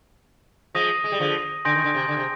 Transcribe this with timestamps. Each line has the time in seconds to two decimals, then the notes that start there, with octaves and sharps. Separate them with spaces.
0.75 F3 G#3 D#6 A#6 D#7
1.04 G#3
1.12 G3
1.19 D3 F3
1.65 D3 G#5 C6 G6 A#6 D7
1.75 D#3
1.84 D3
1.94 C3
2.08 D3
2.16 C3